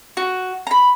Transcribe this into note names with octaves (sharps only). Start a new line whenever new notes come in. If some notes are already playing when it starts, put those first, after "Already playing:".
F#4
A#5 B5